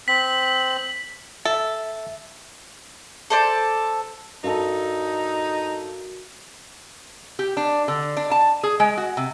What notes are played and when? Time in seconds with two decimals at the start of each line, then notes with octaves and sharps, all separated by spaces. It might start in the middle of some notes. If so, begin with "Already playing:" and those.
0.08 C4 B6 F#7
1.45 A4 E5
3.30 A4 C5 D5
4.44 G2 D#4 F#4 A4 A#4
7.39 G4
7.57 D4
7.88 D3
8.17 D4
8.31 A5
8.63 G#4
8.80 G#3
8.97 F#4
9.17 C3